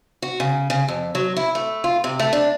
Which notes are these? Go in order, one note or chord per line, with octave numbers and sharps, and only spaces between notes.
F#4
C#3
C#3
F2
F#3
E4
A3
F4
C3
A3
D4